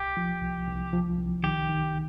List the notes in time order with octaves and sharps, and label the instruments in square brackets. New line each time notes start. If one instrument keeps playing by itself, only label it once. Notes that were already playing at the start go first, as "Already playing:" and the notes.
Already playing: [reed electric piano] C2 [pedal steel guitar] G4
[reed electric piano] F3
C2
C2
F3
C2
[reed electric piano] D#3 [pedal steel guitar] G4
[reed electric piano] D#3